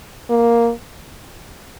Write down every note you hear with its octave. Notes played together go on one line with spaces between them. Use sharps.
A#3